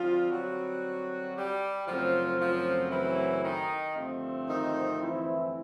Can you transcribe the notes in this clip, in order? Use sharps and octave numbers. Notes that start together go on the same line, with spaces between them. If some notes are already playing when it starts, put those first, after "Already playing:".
Already playing: D3 F3 G3 C4 F4
F#3 F#4
G3 G4
F#2 C#3 F3 F#3 A3 C4 F4
F3 F4
E3 E4
D#3 D#4
G2 D3 F3 A3 C4
D#3 D#4
E3 E4